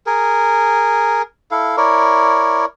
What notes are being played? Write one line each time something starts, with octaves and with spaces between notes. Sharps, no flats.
G#4 A#4
E4 A4 F5
E4 A#4 C#5 D5